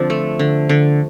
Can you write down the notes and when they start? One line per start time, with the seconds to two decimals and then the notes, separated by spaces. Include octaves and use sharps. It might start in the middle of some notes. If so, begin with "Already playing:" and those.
Already playing: D3 F3 C4 D4
0.10 A3
0.39 D3
0.69 D3